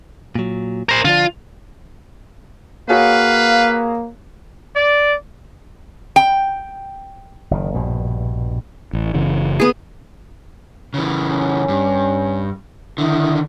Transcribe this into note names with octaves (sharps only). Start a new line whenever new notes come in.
A#2 F#3
A#4 C5
D3 F3 D4 F4
A#3 F#4 G#4 B4 C#5 F5
D5
G5
F#1 B2 D#3
A#1 G2 B2
A1
F#1 C#3 E3
B3 G#4
C#3 E3
C#4
G2
D3 D#3 E4